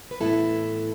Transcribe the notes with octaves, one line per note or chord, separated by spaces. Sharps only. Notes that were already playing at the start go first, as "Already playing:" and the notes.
B4
A2 E3 B3 E4 A4